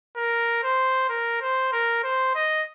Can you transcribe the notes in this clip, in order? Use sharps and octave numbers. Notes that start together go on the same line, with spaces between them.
A#4
C5
A#4
C5
A#4
C5
D#5